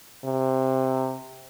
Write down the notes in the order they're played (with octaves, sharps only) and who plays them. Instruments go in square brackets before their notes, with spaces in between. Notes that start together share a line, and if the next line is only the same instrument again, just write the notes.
[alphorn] C3